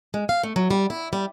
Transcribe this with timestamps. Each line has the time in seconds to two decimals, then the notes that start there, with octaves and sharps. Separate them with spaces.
0.14 G#3
0.29 F5
0.43 A3
0.56 F#3
0.71 G3
0.90 E4
1.13 G3